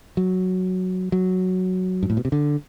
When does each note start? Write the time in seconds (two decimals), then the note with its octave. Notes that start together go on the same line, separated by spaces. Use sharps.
0.17 F#3
1.12 F#3
2.03 G2
2.10 A2
2.17 B2
2.25 C3
2.32 D3